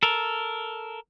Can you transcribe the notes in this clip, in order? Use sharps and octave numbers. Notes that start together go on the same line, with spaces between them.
A4 A#4